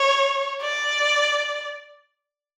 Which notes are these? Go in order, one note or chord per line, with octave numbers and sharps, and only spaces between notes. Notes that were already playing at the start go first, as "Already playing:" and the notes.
Already playing: C#5
D5